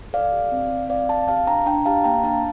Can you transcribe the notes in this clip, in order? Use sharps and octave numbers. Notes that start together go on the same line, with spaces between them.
A4 D5 F5
G4
C4
C4
C4 D5 F5
C4 F5 A5
G4 F5 A5
D4 G5 A#5
D4 G5 A#5
G4 F5 A5
A#3 G5 A#5
D4 F5 A5